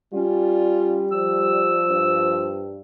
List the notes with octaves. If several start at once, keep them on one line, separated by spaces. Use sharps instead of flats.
G3 C#4 F4
F3 E6
G2